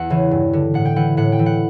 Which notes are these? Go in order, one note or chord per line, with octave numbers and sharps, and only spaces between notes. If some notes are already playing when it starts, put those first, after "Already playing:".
Already playing: E2 F#5
C#3 E3
G2
D3
A2 F#5
G5
E3 F#5
A2 F#5
G5
E3
F#5